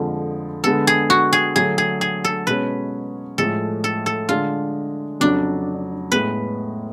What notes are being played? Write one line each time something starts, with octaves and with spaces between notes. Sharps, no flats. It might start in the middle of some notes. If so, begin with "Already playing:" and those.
Already playing: F2 D3 F3 G#3
D3 G#3 B3 A4
G#4
F#4
G#4
D3 F#3 A3 G#4
G#4
G#4
A4
B2 G#3 C#4 B4
A2 F3 G#3 A4
A4
A4
D3 G#3 D4 F4
F2 C#3 F#3 D4
A2 G#3 B3 B4